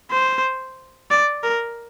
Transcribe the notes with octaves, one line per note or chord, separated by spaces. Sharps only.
C5
D5
A#4